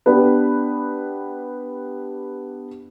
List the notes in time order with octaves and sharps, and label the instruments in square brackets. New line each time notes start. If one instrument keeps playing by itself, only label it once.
[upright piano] B3 D4 G4 B4